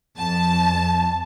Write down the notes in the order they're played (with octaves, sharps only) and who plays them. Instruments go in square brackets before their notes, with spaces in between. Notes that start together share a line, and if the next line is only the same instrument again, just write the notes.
[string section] F2 A5